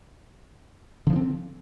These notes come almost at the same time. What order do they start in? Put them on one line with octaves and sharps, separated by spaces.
D3 F3 D4 C4